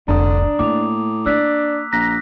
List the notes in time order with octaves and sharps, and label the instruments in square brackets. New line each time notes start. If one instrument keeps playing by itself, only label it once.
[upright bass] F1 C2 [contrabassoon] D3 [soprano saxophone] D4 [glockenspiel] A#5 D#6
[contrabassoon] A2 [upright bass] A#3 [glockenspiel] D6 F7
[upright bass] A#3 [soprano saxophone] D4 [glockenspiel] E6 F#6 B6
[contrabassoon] A#1 [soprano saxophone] A#5 [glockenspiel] F#6 A#6 B6